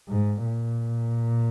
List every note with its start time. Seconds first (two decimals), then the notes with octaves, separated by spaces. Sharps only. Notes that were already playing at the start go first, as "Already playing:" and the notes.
0.09 G#2
0.46 A#2